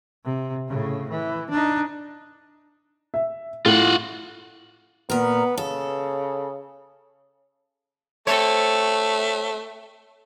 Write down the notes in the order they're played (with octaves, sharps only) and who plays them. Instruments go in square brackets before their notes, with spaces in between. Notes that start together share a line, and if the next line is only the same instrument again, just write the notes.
[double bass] C3
A2 C#3
E3
D4 D#4
[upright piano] E5
[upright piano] A2 [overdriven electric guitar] F4 F#5
[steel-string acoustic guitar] A#2 A#4 [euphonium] B3
[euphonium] C#3 [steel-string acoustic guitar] A4
[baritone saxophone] A3 [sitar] C4 A4 C#5